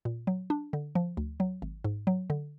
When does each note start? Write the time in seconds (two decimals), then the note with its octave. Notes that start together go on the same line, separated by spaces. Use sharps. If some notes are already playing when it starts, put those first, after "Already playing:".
0.05 A#2
0.27 F#3
0.50 D4
0.73 D3
0.95 F3
1.17 D2
1.40 F#3
1.62 G#1
1.84 G#2
2.07 F#3
2.30 D3